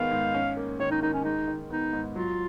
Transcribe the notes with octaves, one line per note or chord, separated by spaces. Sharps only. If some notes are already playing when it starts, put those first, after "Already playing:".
Already playing: D#3 G#3 B3 F5
G#2
C#4
A#3
D#3 C#5
D#4
D#3 D#4
C#4
G#3 D#4
D#3
B3 D#4
G#2
F#3 F4